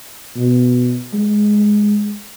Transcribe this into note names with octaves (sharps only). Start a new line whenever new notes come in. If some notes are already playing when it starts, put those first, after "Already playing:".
B2
G#3